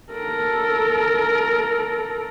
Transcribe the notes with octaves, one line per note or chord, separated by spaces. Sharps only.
A4 A#4